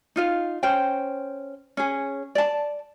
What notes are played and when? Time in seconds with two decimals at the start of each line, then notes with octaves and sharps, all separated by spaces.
0.16 D#4 F4 F5
0.63 C#4 C5 G5
1.77 C#4 G#4
2.35 D5 A5